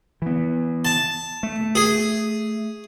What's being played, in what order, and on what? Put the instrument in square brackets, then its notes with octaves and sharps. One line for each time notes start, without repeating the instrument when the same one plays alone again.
[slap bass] E3 B3
[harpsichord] A5
[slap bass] A3
[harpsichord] G#4